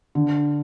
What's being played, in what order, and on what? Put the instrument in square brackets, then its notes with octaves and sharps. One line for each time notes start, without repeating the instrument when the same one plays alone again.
[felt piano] D3